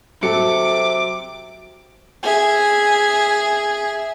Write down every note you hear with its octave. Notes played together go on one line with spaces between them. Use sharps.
C3 F#3 A4 D6 C#7
G#4 E5